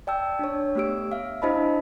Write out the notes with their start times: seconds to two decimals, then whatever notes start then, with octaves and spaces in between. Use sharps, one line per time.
0.07 D5 G5 A5 E6
0.39 D4 C#5
0.75 A3 B3 G4 E6 D7
1.12 E5 F5
1.42 D4 E4 C5 D#5 A5 B5